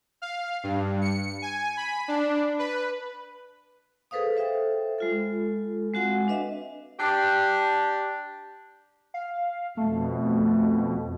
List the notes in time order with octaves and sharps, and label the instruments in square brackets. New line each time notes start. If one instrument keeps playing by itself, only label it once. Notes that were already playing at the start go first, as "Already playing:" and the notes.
[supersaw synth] F5
G2
C#7
G#5
B5
D4
B4
[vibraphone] G#4 A4 B4 C5 F5 D#6
A4 C5 E5 G5
G#3 F4 A4
G#3 C4 F#4 F5 F#5 G#5
D4 B4 D#5 E5
[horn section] D4 G4
[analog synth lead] F5
[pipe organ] F2 B2 [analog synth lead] A3